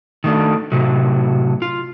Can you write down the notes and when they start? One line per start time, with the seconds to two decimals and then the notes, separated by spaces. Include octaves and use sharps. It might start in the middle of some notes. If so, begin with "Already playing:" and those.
0.24 D#3 A3 D4
0.72 A2 C3 F#3
1.62 F4